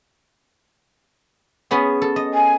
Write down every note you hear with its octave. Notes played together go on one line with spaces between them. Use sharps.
B3 C#4 G#4
A4
D#5
G#5